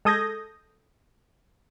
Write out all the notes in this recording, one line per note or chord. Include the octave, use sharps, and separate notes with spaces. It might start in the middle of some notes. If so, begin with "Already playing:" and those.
G#3 A4 D#6 G6 G#6 A#6